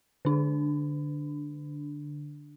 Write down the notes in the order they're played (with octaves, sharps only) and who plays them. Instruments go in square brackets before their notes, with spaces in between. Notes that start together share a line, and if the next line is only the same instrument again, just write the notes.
[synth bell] D3 D4